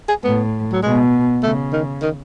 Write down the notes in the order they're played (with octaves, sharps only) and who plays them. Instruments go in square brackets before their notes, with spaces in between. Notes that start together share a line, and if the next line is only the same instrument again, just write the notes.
[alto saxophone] G#4
[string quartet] A2 [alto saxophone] B3
[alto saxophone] F#3
[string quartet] B2 [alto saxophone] G#3
[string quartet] C#3 [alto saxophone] A3
[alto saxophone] D#3
D#3